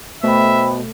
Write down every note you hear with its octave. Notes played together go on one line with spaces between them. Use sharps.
B2 A3 C5 E5 G5 B5